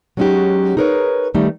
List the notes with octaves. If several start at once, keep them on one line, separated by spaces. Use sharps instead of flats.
F#3 G#3 C#4 D#4 F#4 G4
D#4 G#4 A#4 B4 C#5
D#3 G3 A3 D#4